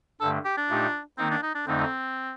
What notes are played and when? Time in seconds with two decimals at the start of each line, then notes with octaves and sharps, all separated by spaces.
0.21 G2 D3 A3 A4
0.45 G4
0.57 D4
0.70 A#2 A3 D#4 G4
1.18 D#3 A#3 C4 D#4
1.31 D4
1.43 D#4
1.55 D4
1.67 F2 D3 A3 C4 D#4